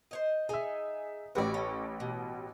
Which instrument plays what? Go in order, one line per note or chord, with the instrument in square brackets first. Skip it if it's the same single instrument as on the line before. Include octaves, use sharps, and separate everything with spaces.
[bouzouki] C5 C#5 D#5
[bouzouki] D#4 G#5 [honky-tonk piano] G#4 E5
[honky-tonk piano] A1 G4 B4 [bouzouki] F#4 D5
[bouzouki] C#4 A4
B2